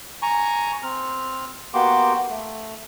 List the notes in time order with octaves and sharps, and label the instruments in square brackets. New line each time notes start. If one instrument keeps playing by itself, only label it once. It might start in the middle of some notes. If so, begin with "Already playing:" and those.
[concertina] G#5 A#5 C#6
C4 F6
A#3 B3 F#4 G4 C6 D6
A3